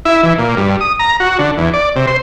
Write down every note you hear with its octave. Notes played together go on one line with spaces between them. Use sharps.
E4
E3
A#2
G2
D#6
A#5
F#4
D3
E2
D5
C3
C5